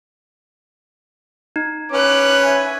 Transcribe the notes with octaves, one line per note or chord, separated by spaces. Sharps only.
D#4
C#4 B4 D6 F#6
E5 G#5